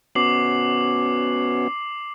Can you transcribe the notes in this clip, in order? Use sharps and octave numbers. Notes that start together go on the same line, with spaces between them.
B3 C#4 F#4 D6 C7 F#7